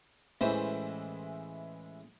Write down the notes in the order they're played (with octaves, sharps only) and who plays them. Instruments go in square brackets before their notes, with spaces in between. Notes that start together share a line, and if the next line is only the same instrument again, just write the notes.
[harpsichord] A1 E3 C5 [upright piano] G#3 E4